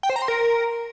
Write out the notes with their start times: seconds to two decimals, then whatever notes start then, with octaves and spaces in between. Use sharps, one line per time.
0.03 G5
0.10 C5
0.16 A#5
0.22 C6
0.28 A#4